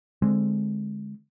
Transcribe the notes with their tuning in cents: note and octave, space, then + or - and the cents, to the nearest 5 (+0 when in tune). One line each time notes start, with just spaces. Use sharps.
D3 +0 G#3 +0 C4 +0